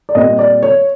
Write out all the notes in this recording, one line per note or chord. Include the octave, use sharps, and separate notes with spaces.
D5
A#2 G3 C4 D#5
D5
C#5